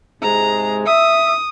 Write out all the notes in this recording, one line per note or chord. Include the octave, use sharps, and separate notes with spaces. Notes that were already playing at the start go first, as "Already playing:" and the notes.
G#2 C3 G#3 A#5
E5 D#6